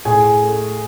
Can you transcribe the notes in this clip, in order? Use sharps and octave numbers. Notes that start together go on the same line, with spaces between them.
A2 G#4 G#5
A3